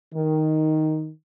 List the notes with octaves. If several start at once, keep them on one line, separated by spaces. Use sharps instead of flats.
D#3